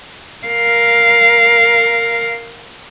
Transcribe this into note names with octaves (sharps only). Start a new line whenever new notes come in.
A#4 F5